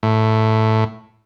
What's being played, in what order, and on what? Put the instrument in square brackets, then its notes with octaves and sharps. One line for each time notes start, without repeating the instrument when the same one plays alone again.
[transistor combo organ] A2